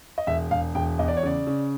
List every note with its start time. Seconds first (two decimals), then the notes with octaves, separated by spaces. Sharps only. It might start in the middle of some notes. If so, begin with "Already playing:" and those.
0.18 D#5
0.27 E1 E5
0.51 E1 F5
0.75 E1 G5
0.99 E2 D#5
1.08 D5
1.17 C#5
1.23 C#3 D5
1.47 C#3